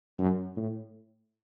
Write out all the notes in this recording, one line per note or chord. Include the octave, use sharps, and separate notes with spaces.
F#2
A2